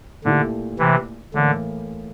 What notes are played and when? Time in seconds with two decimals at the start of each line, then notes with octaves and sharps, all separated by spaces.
0.24 A#2 D3 A3 E4 G4
0.79 C3 E3
1.34 A2 D3 E3 A#3